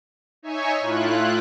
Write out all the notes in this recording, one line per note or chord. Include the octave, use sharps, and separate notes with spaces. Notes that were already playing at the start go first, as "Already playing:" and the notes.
D#4 C#5 E5 G#5 C#6
A2 E4 F4 F#6